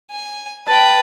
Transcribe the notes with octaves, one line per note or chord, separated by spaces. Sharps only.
G#5
B4 G5 A5